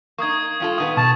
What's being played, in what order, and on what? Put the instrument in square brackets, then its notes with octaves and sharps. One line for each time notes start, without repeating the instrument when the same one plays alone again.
[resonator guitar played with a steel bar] A#3 D#4 [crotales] C#6 D#6 G#6
[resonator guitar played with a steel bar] G2 F4 A4
[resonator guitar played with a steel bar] A#2 D#3 B3 [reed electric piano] D#6
[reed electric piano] B2 [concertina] A5 [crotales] C#6